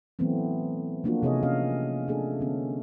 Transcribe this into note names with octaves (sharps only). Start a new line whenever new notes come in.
E3 F#3 A3 B3 C4
F3 A3 A#3 D4 F4 F#4
C3 G#4 C#5 D#5
C4 C#4 D#5 F5
A3 D4 G#4 A4
D3 B3 C#4